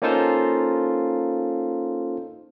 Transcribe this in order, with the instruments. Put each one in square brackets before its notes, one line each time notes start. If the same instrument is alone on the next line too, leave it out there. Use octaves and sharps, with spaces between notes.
[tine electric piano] A#3 C#4 D#4 F4 A4 C5